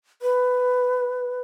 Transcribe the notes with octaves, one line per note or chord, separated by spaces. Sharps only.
B4